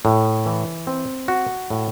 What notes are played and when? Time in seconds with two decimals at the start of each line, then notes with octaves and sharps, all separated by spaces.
0.05 A2
0.46 E3
0.87 C4
1.28 F#4
1.70 A2